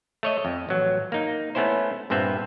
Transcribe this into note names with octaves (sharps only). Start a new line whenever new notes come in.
A3 C#5 D#5
F2
A1 F#3
A#3 D#4
A3 B3 C#4 E4 C5
G2 A#2 B3 C4 E5